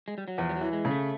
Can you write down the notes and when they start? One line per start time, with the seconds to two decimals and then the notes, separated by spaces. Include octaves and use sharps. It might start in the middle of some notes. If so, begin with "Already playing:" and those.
0.08 G#3
0.18 G3
0.28 F#3
0.38 E2 F3
0.49 G3
0.56 F#3
0.61 E3
0.73 G#3
0.85 C#3
0.91 A3